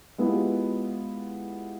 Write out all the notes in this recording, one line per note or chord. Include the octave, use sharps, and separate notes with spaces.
G#3 B3 E4 F4 G4